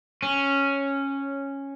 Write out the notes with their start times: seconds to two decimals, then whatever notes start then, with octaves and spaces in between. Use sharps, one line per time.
0.23 C#4